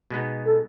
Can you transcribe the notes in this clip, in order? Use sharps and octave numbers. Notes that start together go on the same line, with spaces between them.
B2 G#3 B3 D#4
A4